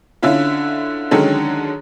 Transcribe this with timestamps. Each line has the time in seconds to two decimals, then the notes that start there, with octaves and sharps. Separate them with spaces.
0.22 D3 C#4 E4 F4
1.11 D3 D#3 F#3 G#3 C#4 A4